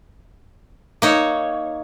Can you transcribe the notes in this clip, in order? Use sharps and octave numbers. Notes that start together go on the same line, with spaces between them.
A#3 D#4 C#5